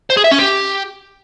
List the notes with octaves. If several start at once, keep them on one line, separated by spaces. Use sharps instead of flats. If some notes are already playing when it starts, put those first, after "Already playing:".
C5
G#4
E5
C#4
G4